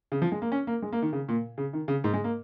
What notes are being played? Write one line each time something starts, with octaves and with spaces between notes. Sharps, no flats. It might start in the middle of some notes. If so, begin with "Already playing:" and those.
C#3
F3
G#3
A#3
C#4
A#3
G#3
A#3
D#3
C#3
A#2
C#3
D#3
C#3
G#2
G#3
A#3